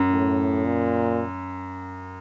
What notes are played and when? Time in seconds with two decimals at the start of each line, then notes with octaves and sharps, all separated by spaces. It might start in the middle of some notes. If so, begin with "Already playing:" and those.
Already playing: F#2
0.10 A2
0.65 A#2